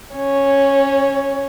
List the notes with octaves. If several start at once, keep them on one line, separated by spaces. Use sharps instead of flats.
C#4 C#5